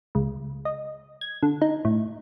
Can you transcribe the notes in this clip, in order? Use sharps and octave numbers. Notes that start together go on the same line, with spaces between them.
C#2
D#5
G#6
D3
D#4
A2